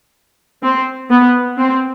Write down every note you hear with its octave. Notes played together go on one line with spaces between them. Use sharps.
C4
B3
C4